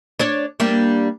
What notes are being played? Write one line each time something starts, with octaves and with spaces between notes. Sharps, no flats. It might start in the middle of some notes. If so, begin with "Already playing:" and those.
D4 C#5 D5
G3 A#3 D4